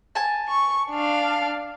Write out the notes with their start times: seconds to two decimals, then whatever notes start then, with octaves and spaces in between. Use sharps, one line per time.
0.15 G#5 A5
0.49 C#6
0.91 D4 F5